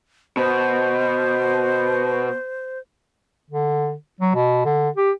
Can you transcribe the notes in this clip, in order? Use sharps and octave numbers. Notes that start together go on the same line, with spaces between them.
B2 C5
D3
F#3
B2
D3
G4